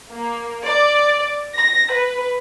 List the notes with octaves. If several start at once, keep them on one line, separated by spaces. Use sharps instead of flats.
A#3
D5
A#6
B4